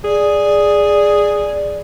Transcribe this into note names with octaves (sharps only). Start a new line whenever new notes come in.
G#4 D5